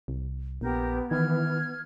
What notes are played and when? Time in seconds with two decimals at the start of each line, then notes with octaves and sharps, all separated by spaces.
0.08 C2
0.61 A#1 B3 G4 A#4 G6
1.11 D#3 E3 F6 G#6